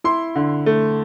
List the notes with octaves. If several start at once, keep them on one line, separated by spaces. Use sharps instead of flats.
E4 C6
D3
A3